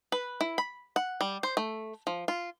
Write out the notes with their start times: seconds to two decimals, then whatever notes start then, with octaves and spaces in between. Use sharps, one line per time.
0.12 B4
0.41 E4
0.58 B5
0.96 F#5
1.21 G3
1.43 C5
1.57 A3
2.07 F3
2.28 F4